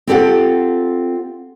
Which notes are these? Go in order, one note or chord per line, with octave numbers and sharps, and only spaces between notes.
C4 F4 G4 A4 D5 F#5